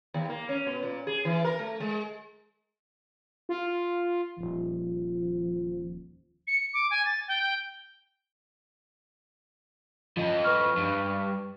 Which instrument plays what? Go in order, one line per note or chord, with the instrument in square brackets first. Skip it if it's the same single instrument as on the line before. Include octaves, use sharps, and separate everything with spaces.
[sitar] D#2
A#3
C#4
B2
A#2
G#4
E3
A#4
A3
G#3
[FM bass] F4
[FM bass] D#1 [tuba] F3
[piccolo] C#7
D6
G#5
A6
G5
[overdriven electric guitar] F3 D#5
[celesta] B4 C#6 F6
[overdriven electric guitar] G2